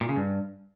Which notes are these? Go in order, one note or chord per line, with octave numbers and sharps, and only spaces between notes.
A#2
C#3
G2